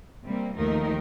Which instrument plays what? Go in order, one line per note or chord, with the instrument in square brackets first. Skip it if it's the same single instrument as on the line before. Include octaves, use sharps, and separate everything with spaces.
[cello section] C3 G3 A#3 C4
D#2 D#3 F3 A3 D#4 A#4